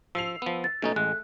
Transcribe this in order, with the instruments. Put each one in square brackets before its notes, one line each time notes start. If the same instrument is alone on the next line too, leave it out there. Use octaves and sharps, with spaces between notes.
[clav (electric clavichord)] F3 [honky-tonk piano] E6 C7 F7
[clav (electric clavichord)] F3 B3
[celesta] A6
[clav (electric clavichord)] B2 C#4 D#4 [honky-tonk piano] A3
[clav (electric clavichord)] A1 G#3 [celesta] F#6